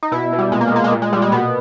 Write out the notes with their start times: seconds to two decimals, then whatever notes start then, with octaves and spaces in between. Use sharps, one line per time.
0.03 D#4
0.12 B2 E4
0.33 B2
0.39 G3
0.52 A#2 G#3
0.61 A#3
0.68 G#3
0.72 A#2 A#3
0.84 G#3
0.92 A#2
1.02 G#3
1.12 A#2 G3
1.22 G#3
1.32 B2 B3